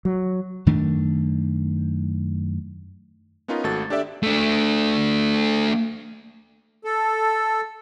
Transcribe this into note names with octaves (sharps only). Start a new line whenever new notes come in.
F#3
F#2 D#3 A3 D4
B3 C#4 D#4 F4 A#4 B4
G#1 A3 F#4 A4 A6
D4 G4 A4 D5 E5
A3 D4
A4